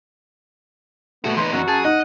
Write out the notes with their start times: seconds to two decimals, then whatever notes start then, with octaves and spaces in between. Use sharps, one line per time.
1.24 A#2 A3 B3 F#4
1.37 E2 D#4 B4 C6
1.53 F#2 F#4
1.68 G#4 A5
1.85 D#4 D#5 F#5